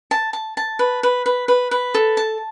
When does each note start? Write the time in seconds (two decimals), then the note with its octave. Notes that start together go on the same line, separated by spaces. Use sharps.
0.11 A5
0.33 A5
0.57 A5
0.79 B4
1.03 B4
1.26 B4
1.48 B4
1.71 B4
1.94 A4
2.17 A5